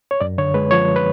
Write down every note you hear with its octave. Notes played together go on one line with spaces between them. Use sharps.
C#5
F#2 D5
D3 C#5
G#3 B4
F3 C#5
B4